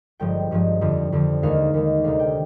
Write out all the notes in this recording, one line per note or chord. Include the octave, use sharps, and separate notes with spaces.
G1 G2 F3 G#3 G5
G1 G2 F3 G#3
F2 D3 F3
F2 D3 F3
D#2 D#3 G#3 F5
D#2 D#3 G#3
D2 C3 D#3 F5
G5